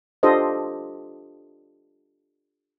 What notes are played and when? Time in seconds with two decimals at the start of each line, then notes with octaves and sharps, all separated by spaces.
0.23 D4 F4 G4 A4 C5 D#5